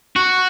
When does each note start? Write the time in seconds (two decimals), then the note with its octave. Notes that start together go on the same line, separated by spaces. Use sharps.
0.16 F#4